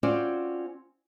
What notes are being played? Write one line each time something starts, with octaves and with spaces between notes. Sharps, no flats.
C4 C#4 F4 F#4 C5 D5